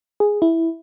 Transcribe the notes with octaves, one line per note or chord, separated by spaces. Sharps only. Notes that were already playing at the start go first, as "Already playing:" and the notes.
G#4
E4